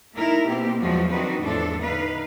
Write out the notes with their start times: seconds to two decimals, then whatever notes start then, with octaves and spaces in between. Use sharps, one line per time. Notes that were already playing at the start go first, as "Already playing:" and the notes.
0.14 A3 D#4 E4 A#4
0.47 B2 A#3 C4 G4
0.80 E2 F3 F#3 G#3 F#4
1.12 D#3 C4 D4 F#4 B4 D#5
1.42 E2 A2 F3 D4 A4
1.81 D3 D#4 B4 F5